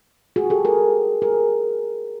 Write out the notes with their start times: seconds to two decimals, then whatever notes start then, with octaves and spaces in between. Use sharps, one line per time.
0.36 F#4 G#4
0.50 G4 A4
0.65 G#4 A#4
1.22 G#4 A#4